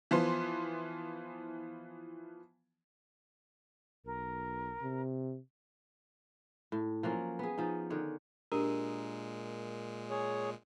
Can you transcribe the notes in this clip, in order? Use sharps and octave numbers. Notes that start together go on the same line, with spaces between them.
E3 F3 B3 C6
B1 A#4
C3
A2
F3 F#3 A#3 C#4
B3 G#4
F3 C#4 D#4
D3 D#3 C#5
A#2 G#3 D4 G4 A#4 A#5 E6
G#4 C#5